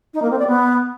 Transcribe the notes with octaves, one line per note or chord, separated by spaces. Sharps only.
D#4
A#3
C4
D5
B3